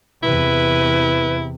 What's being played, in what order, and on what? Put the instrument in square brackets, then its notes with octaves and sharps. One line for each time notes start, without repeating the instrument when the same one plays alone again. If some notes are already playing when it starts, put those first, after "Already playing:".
[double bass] E2 C3 [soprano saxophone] E4 [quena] B4